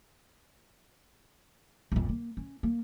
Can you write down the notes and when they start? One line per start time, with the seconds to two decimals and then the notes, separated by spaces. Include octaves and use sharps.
1.92 A#1 F2
2.09 A#3
2.37 C#4
2.63 A#3